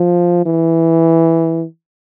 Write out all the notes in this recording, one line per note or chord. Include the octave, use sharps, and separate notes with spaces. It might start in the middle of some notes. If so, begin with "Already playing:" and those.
Already playing: F3
E3